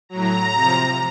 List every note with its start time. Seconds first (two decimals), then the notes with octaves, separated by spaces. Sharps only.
0.09 A2 F#3 A#5
0.55 C3 F3